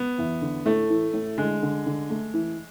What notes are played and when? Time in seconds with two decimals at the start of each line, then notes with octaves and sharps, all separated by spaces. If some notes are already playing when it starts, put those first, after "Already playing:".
Already playing: B3
0.18 E2
0.41 D3
0.65 A2 A3
0.90 E3
1.13 A2
1.38 D3 G#3
1.62 D3
1.86 D3
2.10 A3
2.34 E3